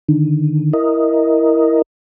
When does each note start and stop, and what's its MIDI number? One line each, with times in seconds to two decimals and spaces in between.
0.09 0.73 50
0.09 0.73 51
0.73 1.82 64
0.73 1.82 70
0.73 1.82 75